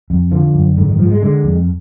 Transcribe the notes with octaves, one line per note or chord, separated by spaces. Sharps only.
F2
D3 F3
F#2
G#2 D3
D#3
G#2 F3
G#3
D3 G#3
F2